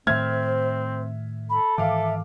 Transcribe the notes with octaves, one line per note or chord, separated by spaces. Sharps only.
A2 D#3 A3 C4 C5 E5 F6 G#6
A4 B5
G#2 D#3 E3 E5 F5 D6